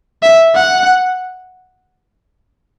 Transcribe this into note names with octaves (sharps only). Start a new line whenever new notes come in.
E5
F#5